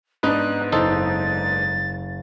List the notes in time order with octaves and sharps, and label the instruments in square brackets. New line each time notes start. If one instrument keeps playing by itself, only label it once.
[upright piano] G#2 B3 D4 [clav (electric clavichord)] D#4 B4 [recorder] F#6
[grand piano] F#1 [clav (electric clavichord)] D#4 A4 C5 [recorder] A6